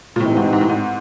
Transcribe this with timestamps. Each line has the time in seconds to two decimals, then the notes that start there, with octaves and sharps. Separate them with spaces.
0.16 A#2
0.20 A2 C3 E3 G#3 C4 D#4
0.37 G#2
0.53 G#2
0.61 A2
0.70 G#2